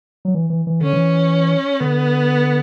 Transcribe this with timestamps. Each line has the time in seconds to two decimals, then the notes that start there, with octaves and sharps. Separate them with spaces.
0.25 F#3
0.35 E3
0.50 E3
0.67 E3
0.81 D3 C#4
0.93 E3
1.80 D3 B3